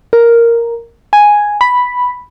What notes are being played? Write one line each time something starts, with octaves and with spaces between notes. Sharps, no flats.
A#4
G#5
B5